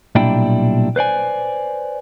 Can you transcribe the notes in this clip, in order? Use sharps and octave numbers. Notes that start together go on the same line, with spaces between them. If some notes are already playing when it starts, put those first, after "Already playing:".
B1 A#2 G3 D4 E4 G5
B4 C5 D5 G#5